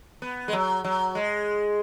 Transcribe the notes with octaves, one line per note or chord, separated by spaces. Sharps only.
B3
G#3
F#3
F#3
G#3